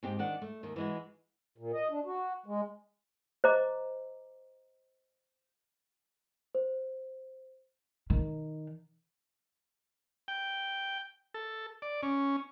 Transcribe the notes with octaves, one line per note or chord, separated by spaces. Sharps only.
G#2 C4 G4
D#3 D4 F#5
A3
D#2 D#3
E3 G#3 F#4
A#2
D#5
D4
F#4
G#3
C5 D#5 A#5 D6
C5
D#3
G5
A4
D5
C#4